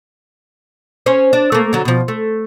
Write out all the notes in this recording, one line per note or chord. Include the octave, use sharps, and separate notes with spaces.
C#4 C5 C#5
D4
A3 A#3
D3 F#3
B2 F3
A3